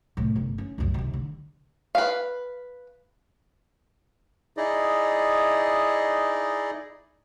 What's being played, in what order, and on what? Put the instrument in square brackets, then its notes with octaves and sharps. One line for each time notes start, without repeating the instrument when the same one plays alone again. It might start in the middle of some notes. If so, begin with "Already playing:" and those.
[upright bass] A2 C3
G1
C#4
C2 F#2
D#2 C3
D3
[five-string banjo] B4 F5
[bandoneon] D#4 E4 G#4 D5 D#5